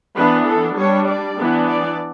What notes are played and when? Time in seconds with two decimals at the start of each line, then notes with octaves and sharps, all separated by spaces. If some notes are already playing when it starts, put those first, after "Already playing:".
0.16 E3 B3 D4 B4
0.47 A4
0.77 G3 D4 C#5
1.07 D5
1.38 E3 B3 D4
1.68 D5